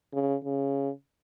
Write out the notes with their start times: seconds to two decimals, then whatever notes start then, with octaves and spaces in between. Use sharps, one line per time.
0.13 C#3
0.45 C#3